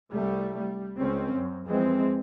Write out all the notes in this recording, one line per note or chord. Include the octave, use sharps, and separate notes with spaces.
C2 G3 A3
G3
C#2 C4 C#4
F#2
F2 E3 G#3 C4